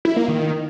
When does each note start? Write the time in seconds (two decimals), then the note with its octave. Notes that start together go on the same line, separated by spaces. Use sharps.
0.05 E4
0.17 A#3
0.28 D#3